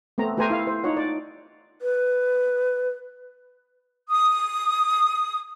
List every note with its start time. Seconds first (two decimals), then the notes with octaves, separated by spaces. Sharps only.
0.18 A3 B3 C4 A#5
0.37 A3 G4 B4 C5 G#5 A#5
0.50 E4 F5
0.67 C5
0.84 D#4 F4 C#5 F#5
0.97 D5
1.82 B4
4.10 D#6